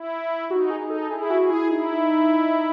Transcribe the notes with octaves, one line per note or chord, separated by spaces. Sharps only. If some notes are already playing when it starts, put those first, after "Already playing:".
Already playing: E4
D#4 F#4
G#4
D#4
A4
E4 G#4
G#4
F#4
G#4
E4
D#4 E4